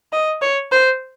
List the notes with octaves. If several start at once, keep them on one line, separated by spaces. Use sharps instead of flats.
D#5
C#5
C5